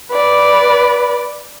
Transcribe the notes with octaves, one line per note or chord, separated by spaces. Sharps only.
B4 D5